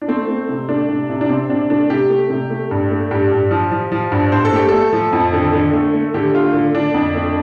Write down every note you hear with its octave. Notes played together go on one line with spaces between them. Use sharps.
D4
A3 C4
A3
C3
A3 D4
C3
C3
D4
C3 C4
C3 D4
A3 D4
C3 G4
A3
C3
A3
G2
A3
G2 G4
G2
F3
F3
F3
G2
G2 C5
A4
A3 G4
A3 A4
F3
F2
D3
D3
A3
A3
D3 G4
A3 F4
D3
D3 D4
F2
A3